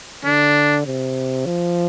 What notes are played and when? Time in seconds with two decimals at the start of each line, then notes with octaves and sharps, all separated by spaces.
0.25 D3 D4
0.86 C3
1.46 F3